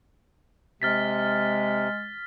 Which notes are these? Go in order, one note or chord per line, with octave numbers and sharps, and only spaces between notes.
C3 G#3 F6 A6 B6